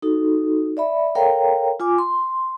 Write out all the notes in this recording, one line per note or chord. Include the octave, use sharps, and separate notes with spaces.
D#4 F#4 A4
D5 E5 B5
A4 A#4 C#5 F5 G5 A#5
F4 G#5 D6
C6